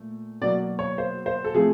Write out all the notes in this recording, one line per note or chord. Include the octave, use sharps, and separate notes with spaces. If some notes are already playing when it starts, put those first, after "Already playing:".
Already playing: A#2 A3
B2 F#3 A#3 D5
C#5
C5
C5
A4
C3 F3 A3 G#4